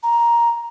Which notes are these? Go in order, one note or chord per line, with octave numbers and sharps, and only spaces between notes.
A#5